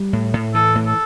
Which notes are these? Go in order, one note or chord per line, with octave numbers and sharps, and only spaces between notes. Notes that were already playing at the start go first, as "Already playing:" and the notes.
Already playing: G3
A2
A2
E3 A4
A2
A4